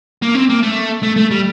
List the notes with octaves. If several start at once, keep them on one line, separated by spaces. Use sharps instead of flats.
A#3
C4
A#3
A3
A3
A3
G3